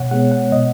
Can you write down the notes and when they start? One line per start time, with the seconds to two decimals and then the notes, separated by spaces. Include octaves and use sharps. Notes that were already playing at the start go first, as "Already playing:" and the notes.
Already playing: B2 C#5 F#5
0.11 G#3 B3 F#5
0.32 F#5
0.52 B2 D#5